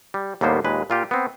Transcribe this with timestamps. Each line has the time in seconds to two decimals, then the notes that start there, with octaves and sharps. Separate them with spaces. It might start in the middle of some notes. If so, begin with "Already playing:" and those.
0.14 G3
0.41 D#2 A2 G3 A#3 B3 C5
0.64 D#2 A#2 G#3 B4
0.90 A#2 F4 G4
1.11 B3 C4